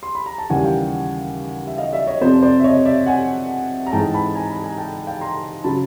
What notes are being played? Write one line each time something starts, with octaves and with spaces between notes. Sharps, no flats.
C6
B5
A#5
A5
D#2 C#3 E3 G3 F#5 G#5
F5 G5
E5
D#5 F5
D5 E5
C#5 D#5
F2 C3 F3 C5 D5
C5 D5
E5
C#5 D#5
D5 E5
F#5 G#5
A#5
G#2 E3 G#3 G5 A5
A5 B5
G#5 A#5
A5 B5
G#5 A#5
G5 A5
F5 G5
A#5 C6
C#3 F#3 A5 B5